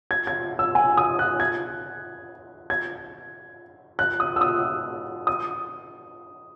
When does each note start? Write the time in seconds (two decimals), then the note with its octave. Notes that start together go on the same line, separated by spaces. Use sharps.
0.11 G#6
0.27 G#6
0.59 E6
0.75 G#5
0.97 D#6
1.19 F#6
1.40 G#6
2.70 G#6
3.99 F#6
4.20 D#6
4.36 E6
4.41 D#6
5.27 D#6